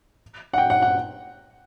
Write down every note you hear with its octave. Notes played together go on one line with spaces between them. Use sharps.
F#5
G5
F#5
F#5